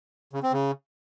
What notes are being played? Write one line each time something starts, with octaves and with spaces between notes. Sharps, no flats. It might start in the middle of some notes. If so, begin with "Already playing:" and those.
C#3
C4
C#3